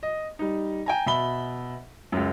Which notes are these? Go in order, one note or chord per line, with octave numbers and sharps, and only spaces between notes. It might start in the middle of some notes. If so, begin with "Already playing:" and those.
D#5
G3 D#4
G5 G#5 A#5
B2 E5 B5 G7
C#2 F#2